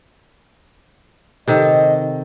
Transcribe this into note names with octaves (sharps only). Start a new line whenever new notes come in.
C3 D#3 A4 D#5